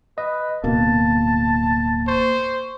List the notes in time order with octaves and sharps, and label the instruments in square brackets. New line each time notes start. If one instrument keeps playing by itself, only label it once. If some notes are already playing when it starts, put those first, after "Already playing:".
[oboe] B4 [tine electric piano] D#5
[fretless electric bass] D1 B2 D3 [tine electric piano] A#3 [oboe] A5
[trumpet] C5 [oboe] C#6